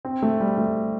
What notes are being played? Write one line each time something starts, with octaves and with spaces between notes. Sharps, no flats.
C4
A3
G3
A3